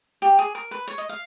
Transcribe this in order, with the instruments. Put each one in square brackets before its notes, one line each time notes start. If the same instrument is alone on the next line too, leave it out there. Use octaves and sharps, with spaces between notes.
[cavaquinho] G4
G#4
A#4
B4
C#5
D#5
F5